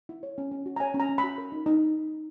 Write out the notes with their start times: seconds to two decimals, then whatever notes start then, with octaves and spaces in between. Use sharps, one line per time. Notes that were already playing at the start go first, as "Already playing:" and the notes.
0.09 E4
0.23 C#5
0.38 C#4
0.52 C#4
0.66 F#4
0.76 A#5
0.80 C#5 G#5
0.94 C#4
1.00 A#5
1.09 C#4
1.18 B5
1.23 F#4
1.38 A#4
1.52 D#4
1.66 D#4